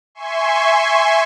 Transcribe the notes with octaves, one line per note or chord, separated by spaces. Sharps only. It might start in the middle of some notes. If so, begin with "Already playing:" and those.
E5 G#5 C6 C#6